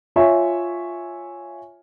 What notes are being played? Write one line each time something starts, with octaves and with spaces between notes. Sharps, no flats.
F4 C#5 E5 G#5 C#6